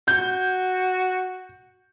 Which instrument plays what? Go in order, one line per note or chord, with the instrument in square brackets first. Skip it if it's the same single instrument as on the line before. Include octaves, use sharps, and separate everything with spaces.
[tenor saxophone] F#4 [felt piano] G6